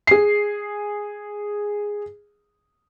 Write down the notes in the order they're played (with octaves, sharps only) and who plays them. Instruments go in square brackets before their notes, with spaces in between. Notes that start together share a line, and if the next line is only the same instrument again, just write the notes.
[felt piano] G#4 C7